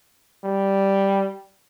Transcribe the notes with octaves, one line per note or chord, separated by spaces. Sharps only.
G3